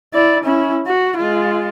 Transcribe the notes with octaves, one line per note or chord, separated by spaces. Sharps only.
E4 D5
C#4 E4
F#4
G#3 F4